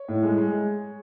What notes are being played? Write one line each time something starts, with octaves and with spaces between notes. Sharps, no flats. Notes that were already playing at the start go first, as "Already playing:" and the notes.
Already playing: C#5
A2
G#3
G#3